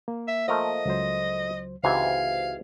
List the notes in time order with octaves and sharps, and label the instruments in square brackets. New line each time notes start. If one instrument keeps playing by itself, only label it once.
[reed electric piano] A#3
[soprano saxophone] E5
[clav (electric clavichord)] F3 A3 A#4 [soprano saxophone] D#5
[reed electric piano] C#2 F#3 C5
[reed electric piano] C#2 F#4 G#6 [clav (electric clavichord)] G#2 C3 E3 [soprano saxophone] F5